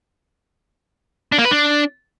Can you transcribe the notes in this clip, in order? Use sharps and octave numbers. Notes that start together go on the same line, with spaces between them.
D4
A#3
B4
D4